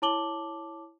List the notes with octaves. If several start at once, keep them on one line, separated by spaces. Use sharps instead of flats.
E4 C#5 A5 D6 F#7 G7